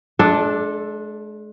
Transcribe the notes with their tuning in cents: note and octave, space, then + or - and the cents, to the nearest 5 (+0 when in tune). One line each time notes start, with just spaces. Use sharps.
G#3 +40 D4 +0 A4 +0